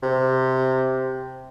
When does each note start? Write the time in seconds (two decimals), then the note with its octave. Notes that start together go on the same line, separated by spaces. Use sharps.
0.03 C3